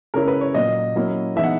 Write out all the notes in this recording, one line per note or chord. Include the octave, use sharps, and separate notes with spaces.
C#3 G#3 C#4 E4 A#4
B4
C#5
A#2 F#3 A#3 D#5
F#3 A#3 C#4 E4
E3 G#3 B3 D#4 E5
F#5